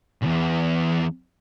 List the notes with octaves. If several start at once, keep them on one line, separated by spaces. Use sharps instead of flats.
B1 E2